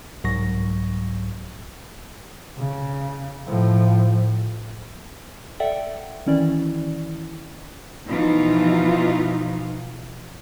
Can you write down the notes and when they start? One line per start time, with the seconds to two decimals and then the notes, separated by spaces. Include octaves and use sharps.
0.24 C2 G#2 F#3 C#6 A#6
2.57 C#3
3.47 A2 F3
5.60 A4 D5 E5 F#5 G5
6.26 D#3 E3 C#4 E4 D5
8.09 B2 E3 F3 D#4 F4